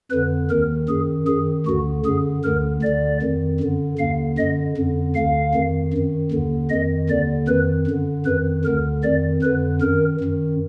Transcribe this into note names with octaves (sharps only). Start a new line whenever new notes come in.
F2 D3 B4
D#2 D#3 A#4
F#2 D#3 G#4
F#2 D#3 G#4
D2 D3 F#4
F#2 D3 G#4
D2 D3 A#4
D2 D5
D3
F2 D#3
F#2 D3
D#2 D3 F5
F#2 D3 D#5
F2 D3
D2 D3 F5
F2 D#3
F#2 D#3
D#2 D3
F2 D#3 D#5
D#2 D3 D5
F2 D#3 B4
F#2 D3
F2 D#3 B4
D2 D3 A#4
F2 D#3 D5
F2 D3 B4
F#2 D#3 A#4
F#2 D#3